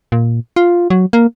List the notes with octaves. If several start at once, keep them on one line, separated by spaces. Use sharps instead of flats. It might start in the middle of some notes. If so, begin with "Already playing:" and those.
A#2
F4
F#3
A#3